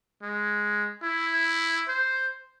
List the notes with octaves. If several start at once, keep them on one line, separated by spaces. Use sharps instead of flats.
G#3
E4
C5